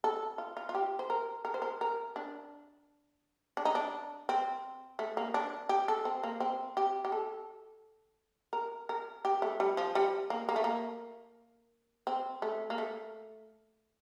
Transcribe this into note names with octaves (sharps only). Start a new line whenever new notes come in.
A4
F4
F4
F4
G4
C5
A#4
A#4
C5
A#4
A#4
D4
D4
D#4
D4
C4
A3
A#3
D4
G4
A4
C4
A#3
C4
G4
G4
A4
A#4
A#4
G4
A3
G3
F3
G3
A#3
A#3
A3
A#3
C4
A3
A#3
A3